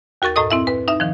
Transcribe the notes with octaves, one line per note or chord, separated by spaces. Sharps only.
D#2 F#4 A#4 C#6 A6
F#2 A2 A4 D#5 D#6
C4 E4 E5
B4
D#4 E5
D#3 F3